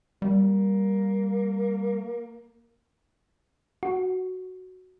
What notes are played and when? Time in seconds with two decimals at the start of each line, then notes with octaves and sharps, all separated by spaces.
0.22 G3 A#3
3.83 F#4